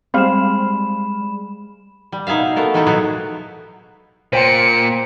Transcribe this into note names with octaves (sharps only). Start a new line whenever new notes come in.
G3 G#3 C4 F5 B5 E7
G3
B2 D#4 G#4 E5 F5
A3 B3 A4 A#4
G#3 D#4 E4 G4 A4
B2 F#3 B3 F#4 G#4
A#2 C5 G5 C6 C#7 D7